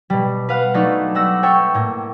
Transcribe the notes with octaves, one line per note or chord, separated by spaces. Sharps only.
B2 G3
B4 F5 F#5
F#3 A3 D4 D#4 A4
G3 A3 F#5 E6 A#6
A4 C#5 E5 G5
A2 A#3